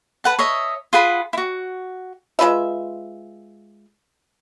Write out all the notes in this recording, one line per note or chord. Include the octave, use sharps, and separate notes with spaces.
B4 F#5 A5
C#5 D#5 E5
F4 G#4 F#5 B5
E4 F#4
G#3 F4 B4 E5